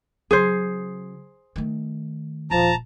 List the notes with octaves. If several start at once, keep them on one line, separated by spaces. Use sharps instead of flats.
C#3 F#3 G#4 C5
D#3 A3
D#1 F3 A5 A#5